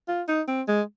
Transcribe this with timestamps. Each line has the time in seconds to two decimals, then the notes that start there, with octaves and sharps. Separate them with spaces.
0.08 F4
0.28 D#4
0.48 C4
0.68 G#3